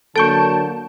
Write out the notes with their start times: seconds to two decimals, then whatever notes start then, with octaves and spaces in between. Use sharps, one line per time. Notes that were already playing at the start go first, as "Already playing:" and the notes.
0.16 D3 F#3 A#3 A4 A5 C#6 G6 D7